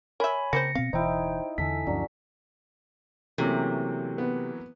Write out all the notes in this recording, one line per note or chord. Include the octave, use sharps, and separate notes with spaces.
A#4 C#5 E5 G#5 B5
C#3 A#3 C4 C5 A#6 C#7
B2 B3 C4 F5
D1 B2 E3 D#4 E4 C5 G5
E2 D3 A4 G#5 B6
D2 G2 F3 F#3 C#4 D4
C3 E3 F#3 A3 A#3 C4 C#4
B3